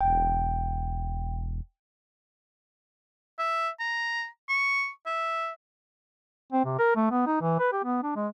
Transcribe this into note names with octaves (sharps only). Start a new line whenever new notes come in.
E1 G5
E5
A#5
C#6
E5
C4
C3
A#4
A3
B3
D#4
E3
B4
G4
B3
D4
G#3